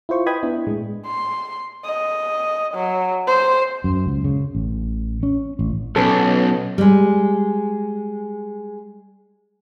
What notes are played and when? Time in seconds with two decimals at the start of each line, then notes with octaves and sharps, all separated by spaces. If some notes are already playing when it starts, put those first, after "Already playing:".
0.09 E4 F4 C5 C#6
0.26 B4 D#5 G5 B5 D#6 G#6
0.43 B3 D4 E4
0.67 A2 G#3
1.06 C6
1.85 D#5
2.74 F#3
3.27 C5
3.84 F#2
4.06 C#2
4.24 C#3
4.55 A1
5.23 C#4
5.59 A1
5.96 B1 B3 C#4 A4
6.78 G3 G#3